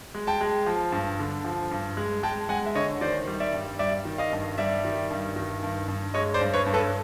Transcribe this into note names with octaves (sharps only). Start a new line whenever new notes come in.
G#3
G5 A5
G#3
F3
G2
D3
F3
G2
G#3
G#3 G5 A5
G#3 F#5 G#5
E5
D3 C#5 D#5
D#3 C5 D5
G3
D5 E5
G2
G3 D5 E5
D#3
D#5 F5
G2
G3 D5 E5
D#3
G2
D#3
G2
G2
G#3 C#5 D#5
C5 D5
G2
B4 C#5
G2
A4 B4